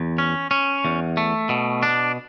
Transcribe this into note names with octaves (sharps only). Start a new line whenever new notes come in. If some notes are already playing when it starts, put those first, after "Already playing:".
Already playing: E2
C#4
C#4
E2
A3
B2
D4